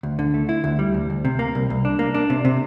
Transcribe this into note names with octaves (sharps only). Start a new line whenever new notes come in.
D2
D3
A3
E4
D2
G3
D2
D2
C3
A#3
C2
C2
D4
A#3
D4
C3
C3